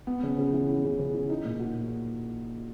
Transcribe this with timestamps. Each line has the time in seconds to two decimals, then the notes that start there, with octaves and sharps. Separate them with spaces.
0.07 B3
0.23 C#3
0.38 C#3
0.53 E3
0.68 B3
0.84 C#3
0.99 C#3
1.14 E3
1.29 D#4
1.45 A#2
1.59 F#4